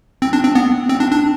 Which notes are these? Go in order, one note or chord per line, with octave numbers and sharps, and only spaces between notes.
C4
D4
C4
B3
C4
D4
D4